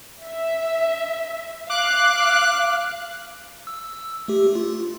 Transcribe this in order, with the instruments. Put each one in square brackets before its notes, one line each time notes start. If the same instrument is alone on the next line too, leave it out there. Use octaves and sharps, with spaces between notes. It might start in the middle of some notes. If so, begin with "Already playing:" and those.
[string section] E5
[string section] F5 [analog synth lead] D6 [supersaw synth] F#6
[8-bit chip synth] E6
A3 G4
F4